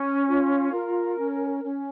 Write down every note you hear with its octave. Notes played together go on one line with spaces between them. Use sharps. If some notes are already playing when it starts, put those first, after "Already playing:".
Already playing: C#4
F4
A#4
C#4
C#4